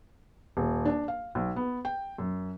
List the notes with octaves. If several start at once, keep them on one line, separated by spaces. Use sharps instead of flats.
D#1
D4
F5
B1
B3
G5
F#2